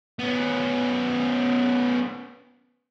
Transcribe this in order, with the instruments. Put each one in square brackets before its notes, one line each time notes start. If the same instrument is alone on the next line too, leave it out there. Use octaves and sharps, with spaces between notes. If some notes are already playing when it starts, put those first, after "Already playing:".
[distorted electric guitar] B3 C#4